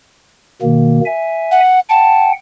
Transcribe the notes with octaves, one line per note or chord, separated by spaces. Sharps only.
B2 D#3 A#3
E5 G#5
F#5
F#5 G5 A5